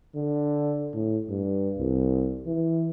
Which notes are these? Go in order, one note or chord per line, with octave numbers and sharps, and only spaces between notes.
D3
A2
G2
C2
E3